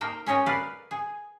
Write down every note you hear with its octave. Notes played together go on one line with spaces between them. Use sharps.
A#3 D#4 A#4 C5 G5
C#4 G#4 C#5 D#5 G5
A#4 B4 D5 F5
G#4